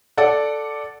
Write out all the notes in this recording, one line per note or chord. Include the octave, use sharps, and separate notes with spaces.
A4 D5 F#5